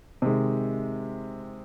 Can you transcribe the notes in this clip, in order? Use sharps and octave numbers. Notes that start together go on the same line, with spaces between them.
C3 D#3 G#3